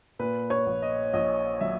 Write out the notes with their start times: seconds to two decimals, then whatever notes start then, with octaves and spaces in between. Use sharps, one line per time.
0.19 A#2 B4
0.50 C#5
0.66 A#1
0.82 D#5
1.13 A#1 D#5
1.61 F#3 E5